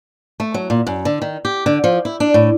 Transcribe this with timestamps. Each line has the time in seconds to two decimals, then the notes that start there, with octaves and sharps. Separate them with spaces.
0.40 A3
0.54 F#3
0.70 A#2
0.87 F#2
1.05 D3
1.22 D#3
1.45 G4
1.66 D3
1.84 F3
2.05 E4
2.20 D4
2.34 A2